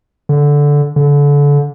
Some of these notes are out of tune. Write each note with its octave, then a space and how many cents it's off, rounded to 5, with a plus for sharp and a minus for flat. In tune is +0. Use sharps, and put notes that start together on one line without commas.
D3 -10
D3 -30